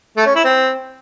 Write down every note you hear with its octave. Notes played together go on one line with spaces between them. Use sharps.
A3
C#4
E4
C4